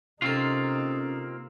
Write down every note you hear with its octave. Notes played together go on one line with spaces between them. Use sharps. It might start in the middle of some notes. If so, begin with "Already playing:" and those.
C3 A#3 C4 C#4 D#4 F4 A4